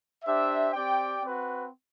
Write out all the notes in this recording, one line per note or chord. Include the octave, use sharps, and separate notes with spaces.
D4 G4 C5 E5
C4 G4 D5 G5
C4 F#4 B4